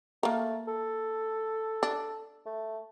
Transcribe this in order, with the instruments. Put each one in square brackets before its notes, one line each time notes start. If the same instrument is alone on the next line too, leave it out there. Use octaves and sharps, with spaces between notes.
[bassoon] A3 [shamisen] A#3 A#4
[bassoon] A4
[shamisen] D4
[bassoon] A3